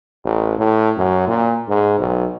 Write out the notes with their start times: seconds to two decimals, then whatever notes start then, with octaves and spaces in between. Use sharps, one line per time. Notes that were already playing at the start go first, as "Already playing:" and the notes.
0.25 A1
0.58 A2
0.97 F#2
1.27 A#2
1.69 G#2
1.99 B1